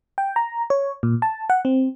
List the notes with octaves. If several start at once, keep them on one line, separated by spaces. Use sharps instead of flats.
G5
A#5
C#5
A#2
A5
F#5
C4